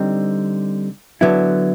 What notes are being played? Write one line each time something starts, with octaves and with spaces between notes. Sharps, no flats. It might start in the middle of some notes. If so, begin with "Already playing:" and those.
Already playing: D3 G3 C4 D#4
D3 F#3 B3 E4